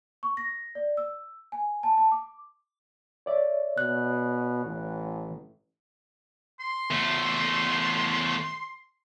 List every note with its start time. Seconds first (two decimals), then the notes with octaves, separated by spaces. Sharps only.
0.23 C#6
0.37 A#6
0.75 D5
0.97 E6
1.52 G#5
1.83 A5
1.97 A5
2.12 D6
3.26 C#5 D5 E5
3.78 B2 F#6
4.65 A1
6.60 C6
6.91 E2 A3